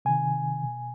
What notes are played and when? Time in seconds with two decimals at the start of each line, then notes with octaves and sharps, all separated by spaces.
0.05 C3 D#3 G#5
0.63 B2